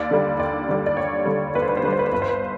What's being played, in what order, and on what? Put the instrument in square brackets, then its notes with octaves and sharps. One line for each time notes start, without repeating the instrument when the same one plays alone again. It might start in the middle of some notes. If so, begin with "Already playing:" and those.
Already playing: [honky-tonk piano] D#2 D5
D3 G3
D#2 D5
D3 G3
D5
D#2 C#5
D3 G3
D#2 B4
C5
B4
C5
D3 B4
G3 C5
B4
C5
G1 B4
C5
B4